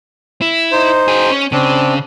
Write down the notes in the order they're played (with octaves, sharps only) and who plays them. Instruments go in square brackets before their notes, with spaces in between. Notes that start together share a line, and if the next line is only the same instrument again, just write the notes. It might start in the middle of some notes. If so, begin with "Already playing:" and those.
[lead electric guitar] E4
[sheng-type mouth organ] D#4 C5
[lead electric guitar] F#4 G#4
C#4
[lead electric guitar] C#3 [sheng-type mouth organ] C4 D4